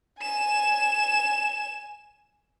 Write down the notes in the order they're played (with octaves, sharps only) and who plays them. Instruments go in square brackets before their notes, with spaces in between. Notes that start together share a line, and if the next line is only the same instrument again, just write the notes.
[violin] G#5 E7